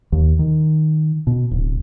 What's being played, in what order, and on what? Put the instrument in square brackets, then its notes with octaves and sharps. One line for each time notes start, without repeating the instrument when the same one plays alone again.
[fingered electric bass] D#2
D#3
B2
D1